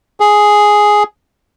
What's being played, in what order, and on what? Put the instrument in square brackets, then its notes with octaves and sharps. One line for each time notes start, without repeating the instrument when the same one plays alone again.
[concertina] G#4